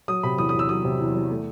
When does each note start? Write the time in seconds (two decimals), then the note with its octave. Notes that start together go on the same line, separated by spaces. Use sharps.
0.08 F#3 D#6
0.23 C3 B5
0.38 E2 D#6
0.49 D#6
0.54 E2
0.59 E6
0.69 F#3 D#6
0.84 C3
1.00 E2
1.15 E2
1.30 A3